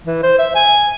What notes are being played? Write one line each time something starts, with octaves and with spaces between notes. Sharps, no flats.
E3
C5
E5
G#5